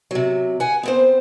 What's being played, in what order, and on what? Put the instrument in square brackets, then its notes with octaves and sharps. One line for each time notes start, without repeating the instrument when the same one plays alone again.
[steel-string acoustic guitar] C3 F#3
F#5 G#5
B3 C4 C5